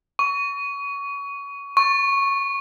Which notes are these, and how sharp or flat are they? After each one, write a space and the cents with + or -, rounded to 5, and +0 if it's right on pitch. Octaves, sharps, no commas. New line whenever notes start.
C#6 +25
C#6 -10